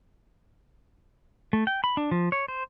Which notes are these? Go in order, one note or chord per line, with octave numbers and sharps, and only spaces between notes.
A3
G5
B5
D4
F3
C#5
C5